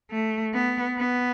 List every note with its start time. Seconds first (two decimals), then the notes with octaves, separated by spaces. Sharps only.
0.11 A3
0.54 B3
0.98 B3